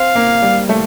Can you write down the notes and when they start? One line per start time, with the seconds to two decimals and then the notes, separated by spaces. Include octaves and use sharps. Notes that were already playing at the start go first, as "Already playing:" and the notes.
Already playing: C4 F5
0.15 A#3
0.42 G3
0.69 A3